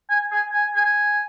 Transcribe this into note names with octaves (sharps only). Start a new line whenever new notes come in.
G#5
G#5
G#5
G#5